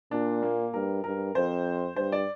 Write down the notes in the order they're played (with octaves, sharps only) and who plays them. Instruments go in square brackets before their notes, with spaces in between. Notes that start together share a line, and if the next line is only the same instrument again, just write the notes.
[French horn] A#2 [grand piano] D4
[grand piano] A#3
[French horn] G2 [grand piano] A#4
[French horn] G2 [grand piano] A#4
[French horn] F2 [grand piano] C5
[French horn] G2 [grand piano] C5
[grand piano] D5